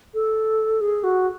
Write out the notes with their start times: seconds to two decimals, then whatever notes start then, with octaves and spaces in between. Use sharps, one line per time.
0.14 A4
0.81 G#4
1.04 F#4